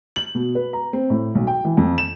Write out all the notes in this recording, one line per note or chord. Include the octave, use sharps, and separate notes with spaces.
F#7
B2
B4
A#5
C4
A2
B1
G5
E3
F2
E7